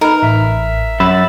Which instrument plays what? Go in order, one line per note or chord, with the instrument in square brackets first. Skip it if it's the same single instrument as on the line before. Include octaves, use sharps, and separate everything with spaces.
[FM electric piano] D#4 B4 [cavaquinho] A#4
[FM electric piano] A1 [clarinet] E5
[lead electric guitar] F#2 [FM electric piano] B5 E6 A6